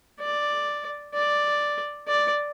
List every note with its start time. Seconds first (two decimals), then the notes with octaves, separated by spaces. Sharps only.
0.20 D5
1.14 D5
2.08 D5